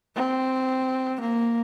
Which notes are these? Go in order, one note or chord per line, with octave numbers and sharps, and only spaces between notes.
C4
A#3